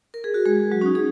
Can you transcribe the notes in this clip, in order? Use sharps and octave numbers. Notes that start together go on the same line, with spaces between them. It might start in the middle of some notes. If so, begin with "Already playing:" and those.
A#4
G#4
F#4
G#3 G#4
F#3 F#4
C#4
D#4
G#4